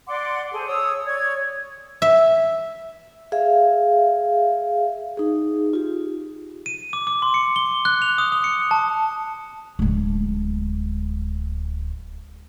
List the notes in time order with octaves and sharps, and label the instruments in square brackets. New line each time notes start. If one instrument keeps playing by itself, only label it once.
[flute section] D5 F#5 C6 D6
G#4 A4 C5
C#5 D#6 E6
C#5 D5 G#6
[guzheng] E5
[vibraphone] G#4 E5 F5
D#4 G#4
F4 G4
[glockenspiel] D#7
D6
D6
C6
C#7
G7
F#6
F7
D#6
D#6
C#7
A5
[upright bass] D1 G#3